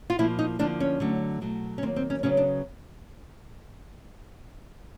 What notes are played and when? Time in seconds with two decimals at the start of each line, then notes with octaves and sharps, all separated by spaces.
0.10 F4
0.19 A#2 F3 A#3 E4
0.39 D#4
0.59 D3 F3 A#3 D4
0.80 C#4
1.00 D3 F#3 A3
1.41 B2 F#3 A3
1.78 C#4
1.82 D#3 F#3 A#3 C4
1.96 C4
2.10 C#4
2.23 C#3 F#3 B3 C#4
2.37 D4